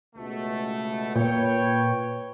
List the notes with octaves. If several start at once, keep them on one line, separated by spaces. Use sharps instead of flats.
C#2 B2 A3
A#2 B4 C#5 G5